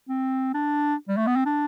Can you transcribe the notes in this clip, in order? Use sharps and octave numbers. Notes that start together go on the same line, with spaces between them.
C4
D4
G3
A3
B3
C4
D4